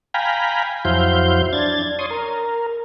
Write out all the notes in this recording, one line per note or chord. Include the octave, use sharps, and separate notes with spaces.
F5 G5 G#5 A#5 B5
F2 F#3 E4 C5 F5 G6
D4 G#6 A6
C#5 C6 D#6
A#4